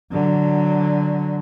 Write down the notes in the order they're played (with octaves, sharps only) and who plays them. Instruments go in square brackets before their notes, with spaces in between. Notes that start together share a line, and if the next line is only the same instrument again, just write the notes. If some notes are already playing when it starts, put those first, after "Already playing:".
[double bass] D3 F#3